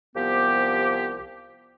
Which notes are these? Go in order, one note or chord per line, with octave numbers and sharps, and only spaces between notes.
C2 F3 B3 G4